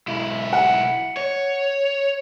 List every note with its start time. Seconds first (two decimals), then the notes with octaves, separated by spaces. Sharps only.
0.08 B1 E4
0.53 F#5
1.17 C#5